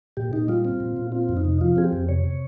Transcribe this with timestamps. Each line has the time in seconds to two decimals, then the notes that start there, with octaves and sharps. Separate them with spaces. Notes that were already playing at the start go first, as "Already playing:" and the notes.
0.17 A#2 G4
0.33 A#2 D#4
0.48 G3 F4
0.65 C4
0.80 A#2
0.96 A#2
1.12 C4 F4
1.29 F2
1.37 D#4
1.45 C3
1.61 F3 F4
1.76 C4 G#4
1.84 G4
1.92 F2
2.08 C3 C#5
2.24 C3